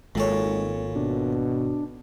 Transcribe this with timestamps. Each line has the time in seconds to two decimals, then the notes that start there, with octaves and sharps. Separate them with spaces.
0.15 G#1 A#2 G#3 A4 C#5
0.96 B2 D4